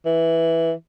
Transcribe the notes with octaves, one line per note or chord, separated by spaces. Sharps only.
E3